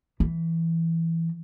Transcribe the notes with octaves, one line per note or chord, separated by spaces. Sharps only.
E3